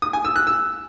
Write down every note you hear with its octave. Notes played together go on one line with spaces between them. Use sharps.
D#6
G#5
E6
F#6
E6